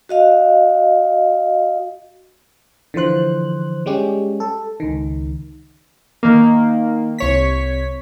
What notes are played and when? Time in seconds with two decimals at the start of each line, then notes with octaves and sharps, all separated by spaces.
0.09 F#4 D#5 F5
2.94 D3 E3 F3 C5 F#6
3.86 G3 G#3 C#4 G4
4.40 A4
4.80 C#2 D#3
6.23 D#3 A#3
7.19 C2 C#5 B6